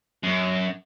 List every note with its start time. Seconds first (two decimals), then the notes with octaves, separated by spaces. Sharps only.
0.24 F#2